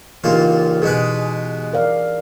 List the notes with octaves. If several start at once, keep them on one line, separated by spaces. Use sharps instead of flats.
C#2 A#2 E3 D#4 F4 G4
B2 G#3 G#4 B4
A#4 D5 F5